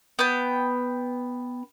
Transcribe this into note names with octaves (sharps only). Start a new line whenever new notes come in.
B3 G5